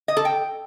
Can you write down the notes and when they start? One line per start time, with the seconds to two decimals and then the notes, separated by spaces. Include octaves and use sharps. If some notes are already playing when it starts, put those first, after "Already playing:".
0.08 D#5
0.17 A4
0.25 G5